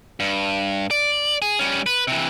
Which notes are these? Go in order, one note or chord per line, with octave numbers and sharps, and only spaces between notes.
G2
D5
G#4
G3 C#4
B4
C3 E3